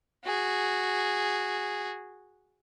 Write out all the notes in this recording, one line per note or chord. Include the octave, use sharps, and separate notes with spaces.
F#4 G#4